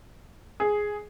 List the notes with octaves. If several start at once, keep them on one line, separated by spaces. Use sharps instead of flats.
G#4